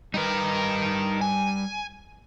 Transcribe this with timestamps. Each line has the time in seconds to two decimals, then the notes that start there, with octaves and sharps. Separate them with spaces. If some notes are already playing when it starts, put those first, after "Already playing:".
0.14 G3 D#4 A#4 B4
1.21 G#5